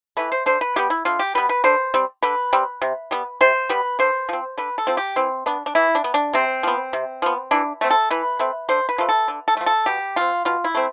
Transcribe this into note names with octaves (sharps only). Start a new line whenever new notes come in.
E3 A3 B4
C5
D3 C5
B4
G3 B3 G4
E4
D3 F4
G4
G3 B3 B4
B4
D3 C5
G3 C4
D3 B4
G3 C4
C3
G3 B3
C3 C5
G3 B3 B4
D3 C5
F3 C4
D3 B4
A4
F3 C4
G4
E3 C4
B3 D4
D4
E3 E4
D4
B3
D4
C3 C4
F3 B3
C3
F3 B3
E3 D4
A3 C4
A4
E3 B4
A3 C4
D3 C5
B4
F3 A3
A4
D3
A4
F3 A3
A4
B2 G4
A3 C4 F4
B2 F4
E4
A3 C4